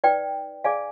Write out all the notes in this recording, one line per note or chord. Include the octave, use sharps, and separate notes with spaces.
D#4 B4 D5 G5
G#4 D5 F5 G#5